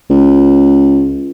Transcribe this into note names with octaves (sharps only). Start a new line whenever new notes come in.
C#2